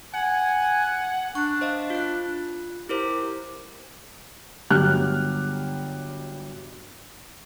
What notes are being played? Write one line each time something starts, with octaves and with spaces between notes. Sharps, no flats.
F#5 G#5
D4 C#6 F#6
C5 D#5 F5
F4 F#6
E4 G4 A#4 C5
G1 F#3 G3 G4 F6 F#6